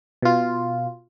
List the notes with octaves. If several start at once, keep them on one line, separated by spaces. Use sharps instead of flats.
B2 F4